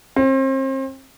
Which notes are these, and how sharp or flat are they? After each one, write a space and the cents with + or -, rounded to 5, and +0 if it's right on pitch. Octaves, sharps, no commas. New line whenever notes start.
C4 +35